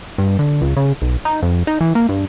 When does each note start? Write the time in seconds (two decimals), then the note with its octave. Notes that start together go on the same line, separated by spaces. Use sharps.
0.18 G2
0.39 D3
0.62 C#2
0.77 C#3
1.02 B1
1.25 D#4
1.43 F2
1.67 D#4
1.81 E3
1.95 A#3
2.09 G2